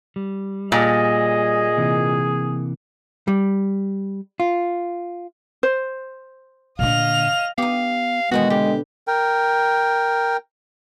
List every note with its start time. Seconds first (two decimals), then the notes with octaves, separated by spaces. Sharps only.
0.16 G3
0.72 A#2 G#4 D#5
1.77 C3 E3 A#3
3.28 G3
4.40 F4
5.63 C5
6.79 A#2 D3 D#5 F5 F7
7.58 B3 D#4 G4 F5
8.31 B2 D#3 E3 G#3 B3 F#4
8.50 D3 G4
9.07 A#4 G5